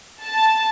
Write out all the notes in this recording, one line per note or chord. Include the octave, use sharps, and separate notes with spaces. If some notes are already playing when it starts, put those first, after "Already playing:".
A5